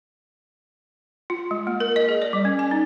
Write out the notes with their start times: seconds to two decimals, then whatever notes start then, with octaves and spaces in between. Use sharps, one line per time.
1.30 F4
1.51 G#3
1.67 A#3
1.80 A#4
1.96 D#5
2.09 G#4
2.22 D5
2.33 G3
2.45 C#4
2.59 G#5
2.71 D#4